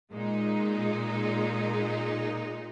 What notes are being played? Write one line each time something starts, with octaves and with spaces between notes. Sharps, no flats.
A#2 G#3 D#4